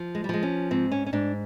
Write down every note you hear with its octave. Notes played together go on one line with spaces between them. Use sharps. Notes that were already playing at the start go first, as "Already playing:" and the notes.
Already playing: F3
G#3
G3
F3 G#3
C#4
G#2 C4
C#4
C#4
G#2 D4